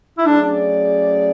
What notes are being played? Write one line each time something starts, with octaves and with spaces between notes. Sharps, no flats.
E4
F#3 A3 C#4 D4 G#4 D5